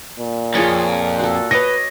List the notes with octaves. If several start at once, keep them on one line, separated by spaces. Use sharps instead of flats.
A#2
F2 F4 G#4 C#5
F#4 A4
B4 C#5 D#5 D6 A#6